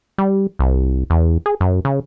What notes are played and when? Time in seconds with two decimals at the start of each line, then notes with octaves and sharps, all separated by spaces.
0.18 G3
0.59 C2
1.10 E2
1.46 G#4
1.60 F#2
1.85 C#3